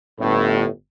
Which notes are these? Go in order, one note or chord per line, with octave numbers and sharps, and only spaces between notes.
G1 A2